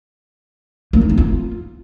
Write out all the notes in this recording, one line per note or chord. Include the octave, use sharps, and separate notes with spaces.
A#3
D#4
C4
F4